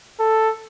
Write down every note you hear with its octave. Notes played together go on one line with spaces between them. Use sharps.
A4